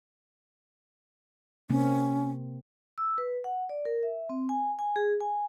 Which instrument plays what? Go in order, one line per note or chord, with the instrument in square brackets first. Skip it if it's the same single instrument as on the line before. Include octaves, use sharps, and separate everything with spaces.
[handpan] C3 A#3 C4 [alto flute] C#4
[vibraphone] E6
B4
F#5
D5
A#4
E5
C4
G#5
G#5
G#4
G#5